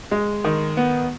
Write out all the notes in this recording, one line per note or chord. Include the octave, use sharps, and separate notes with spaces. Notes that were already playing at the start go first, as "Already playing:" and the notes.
G#3
D#3
B3